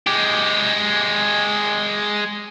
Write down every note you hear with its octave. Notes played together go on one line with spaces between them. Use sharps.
G#3 G4